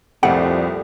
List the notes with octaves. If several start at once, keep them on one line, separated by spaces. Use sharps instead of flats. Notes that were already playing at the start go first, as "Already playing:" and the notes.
C2 F2 A#2 G3 A3 F#5